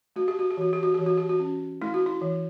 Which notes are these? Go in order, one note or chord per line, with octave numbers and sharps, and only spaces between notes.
A3 F#4
G4
F#4
G4
E3 F#4
G4
F#4
E3 G4
F#4
G4
F#4
C#4
A3 E4
F#4
E4
E3